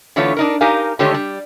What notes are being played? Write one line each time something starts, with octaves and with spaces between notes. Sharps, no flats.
D3 E3 A3 B3 F4 C#5
D4 D#4 A#4
D#4 G4 A#4 F5 G#5
D3 D#3 G#3 A3 G4 C#5
G3